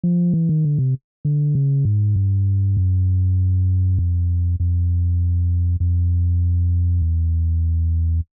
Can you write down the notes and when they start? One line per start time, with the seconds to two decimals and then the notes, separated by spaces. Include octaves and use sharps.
0.04 F3
0.34 E3
0.49 D#3
0.64 D3
0.78 C3
1.25 D3
1.55 C#3
1.85 G#2
2.16 G2
2.77 F#2
3.99 F2
4.60 F2
5.80 F2
7.02 E2